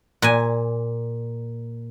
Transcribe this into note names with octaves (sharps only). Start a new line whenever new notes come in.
A#2 G#5